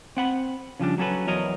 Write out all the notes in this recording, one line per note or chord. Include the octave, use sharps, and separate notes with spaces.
C4 F#5 B5
C#3 F3 G3 D4
F#3 C#4 A4 B4
E2 F#3 A#4 C#5 D#5